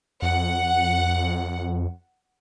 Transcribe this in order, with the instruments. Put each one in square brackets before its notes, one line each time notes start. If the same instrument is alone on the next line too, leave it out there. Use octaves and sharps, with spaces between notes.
[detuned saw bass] F2 [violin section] F#5